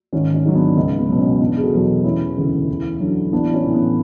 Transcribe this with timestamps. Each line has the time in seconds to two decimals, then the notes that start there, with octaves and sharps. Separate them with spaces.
0.13 G#1 C#4
0.34 C#4
0.45 G#2 F#3
0.55 B3 D4
0.77 C#2
0.98 B3
1.09 B2 F#3
1.19 C#4
1.41 E1 B3 D4
1.56 G#4
1.62 F#4 A4
1.72 E2 B2 F#3
2.04 E1 C#4 E4
2.37 D2 C#3 E3
2.68 E2
3.00 D3 F#3
3.32 A1 B3 D4
3.54 C#4
3.64 A2 E3
3.74 B3